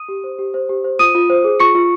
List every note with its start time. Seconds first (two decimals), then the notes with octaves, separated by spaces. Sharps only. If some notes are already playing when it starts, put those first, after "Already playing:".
Already playing: D#6 D#7
0.08 G4
0.24 C5
0.39 G4
0.54 C5
0.69 G4
0.84 C5
0.99 F4 D#6 D#7
1.15 F4
1.30 C5
1.44 G#4
1.60 F4 C#6 C#7
1.75 F4